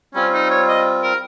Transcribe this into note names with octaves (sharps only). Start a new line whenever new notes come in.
G3 C4 C#4 F4
D#4
C#5
D#5
A#4